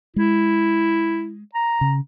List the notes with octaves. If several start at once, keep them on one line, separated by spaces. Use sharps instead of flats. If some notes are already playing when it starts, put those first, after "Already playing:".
G#3 E4
A#5
C#3